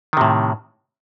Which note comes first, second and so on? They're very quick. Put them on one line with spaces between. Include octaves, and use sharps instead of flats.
D#3 C3 A2